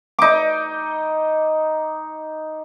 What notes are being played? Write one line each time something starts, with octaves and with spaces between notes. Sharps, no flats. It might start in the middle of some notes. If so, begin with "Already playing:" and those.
D#4 D6